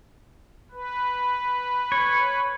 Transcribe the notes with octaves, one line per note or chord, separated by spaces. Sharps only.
B4
C#5